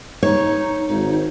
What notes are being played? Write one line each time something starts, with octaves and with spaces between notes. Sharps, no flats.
D#4 C#5
G#1 D#4